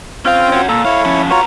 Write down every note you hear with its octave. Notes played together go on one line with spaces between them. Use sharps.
C4 C#4 F4 F5 G5
C#4 F#4
A#2 A4
E4 A4 C#5 F5
F3 C#4
B3 F4 F#4 C#5 A#5